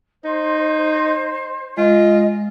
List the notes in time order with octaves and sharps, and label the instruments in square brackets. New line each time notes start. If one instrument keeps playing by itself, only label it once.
[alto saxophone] D#4 [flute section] C5
[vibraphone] G#3 [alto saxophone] F4 [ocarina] D#5